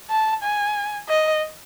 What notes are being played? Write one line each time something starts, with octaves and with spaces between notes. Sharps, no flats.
A5
G#5
D#5